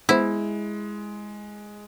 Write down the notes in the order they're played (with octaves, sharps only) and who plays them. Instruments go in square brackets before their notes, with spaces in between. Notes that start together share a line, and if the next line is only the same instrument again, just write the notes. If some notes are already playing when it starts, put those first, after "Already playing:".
[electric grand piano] G#3 [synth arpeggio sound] B3 C5 [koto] E4